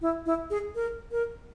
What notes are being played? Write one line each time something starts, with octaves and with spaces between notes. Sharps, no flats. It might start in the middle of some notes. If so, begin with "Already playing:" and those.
E4
E4
G#4
A#4
A#4